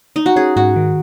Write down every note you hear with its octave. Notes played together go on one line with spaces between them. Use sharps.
D#4
F#4
C#4 G#4
G#2 F#4
D#3